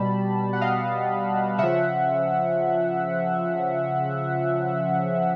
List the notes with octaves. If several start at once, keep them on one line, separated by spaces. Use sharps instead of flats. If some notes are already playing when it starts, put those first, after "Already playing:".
Already playing: B2 G3 A5 B5
F#5
D#5 F5
C#3 F3 E5 F#5